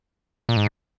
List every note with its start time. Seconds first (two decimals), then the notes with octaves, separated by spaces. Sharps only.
0.49 A#2
0.57 G#2